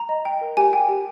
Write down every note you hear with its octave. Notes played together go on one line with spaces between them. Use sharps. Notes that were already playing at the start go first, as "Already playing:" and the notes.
Already playing: A#5
D#5
G5
A#4
G4 G#5
G5
G4